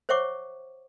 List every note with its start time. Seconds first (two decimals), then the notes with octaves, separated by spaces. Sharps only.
0.09 C5 C#5 E5 F#5 C#6 D6